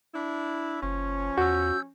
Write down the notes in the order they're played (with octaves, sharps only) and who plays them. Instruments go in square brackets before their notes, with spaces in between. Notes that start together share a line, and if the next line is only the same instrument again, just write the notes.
[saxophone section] D4 E4
[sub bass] F#1 [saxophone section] F3 C#4
[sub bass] E2 [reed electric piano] F#4 [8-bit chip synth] E6 G6